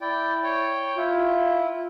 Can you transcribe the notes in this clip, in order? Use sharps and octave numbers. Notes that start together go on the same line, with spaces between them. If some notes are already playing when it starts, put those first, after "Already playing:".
E4 D5 G5
C#5 G5
E4 F4